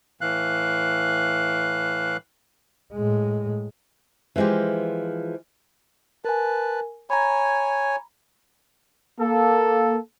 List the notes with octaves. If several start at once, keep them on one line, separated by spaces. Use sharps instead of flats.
A2 E3 F5 F#6
A2 G#3
E3 F3 G#3 F4 G4
A#4 B4 G#5 A5
C#5 G#5 A#5 B5
A#3 A4